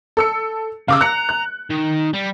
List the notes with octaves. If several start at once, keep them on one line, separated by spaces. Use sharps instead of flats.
A4 E6 C#7
C#3 F5 D6 E6
A#5 F#6 C#7
F#6
D#3
G3